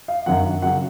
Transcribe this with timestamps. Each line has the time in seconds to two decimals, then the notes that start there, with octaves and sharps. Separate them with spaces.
0.08 F5
0.26 F#2 D#3 F#3 F#5
0.62 C#3 F#3 F#5